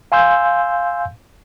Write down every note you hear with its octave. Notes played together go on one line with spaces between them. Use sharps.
F5 G#5 C6 E6 G6